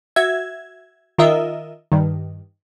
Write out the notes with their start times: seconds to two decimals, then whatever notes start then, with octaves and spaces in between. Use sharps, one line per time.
0.16 F#4 E5 G#6
1.18 D#3 F4 A#4 D#5 E5
1.92 G2 D#3